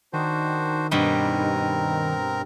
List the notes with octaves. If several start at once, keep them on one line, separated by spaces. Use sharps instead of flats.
D#3 D4 F#4 C5
G2 B2 G3 C4 A#4 A#5